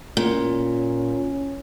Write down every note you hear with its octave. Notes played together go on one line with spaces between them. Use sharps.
A#2 C#4